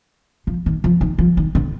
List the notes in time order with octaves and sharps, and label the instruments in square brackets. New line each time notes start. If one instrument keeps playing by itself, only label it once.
[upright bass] F3
D#3
F3
D#3
F3
D#3
D3